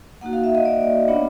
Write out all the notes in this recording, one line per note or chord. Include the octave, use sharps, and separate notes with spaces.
A#3 D#4 F#4 F#5
F5
E5
D#5
D5
B3 D4 F4 C#5